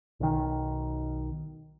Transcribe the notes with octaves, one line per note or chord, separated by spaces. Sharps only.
B1 D#3